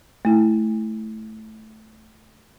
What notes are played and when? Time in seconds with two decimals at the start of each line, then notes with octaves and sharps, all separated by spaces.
0.25 A3 E4